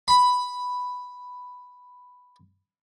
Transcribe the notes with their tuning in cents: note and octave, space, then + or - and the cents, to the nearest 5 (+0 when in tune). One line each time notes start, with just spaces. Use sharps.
B5 +5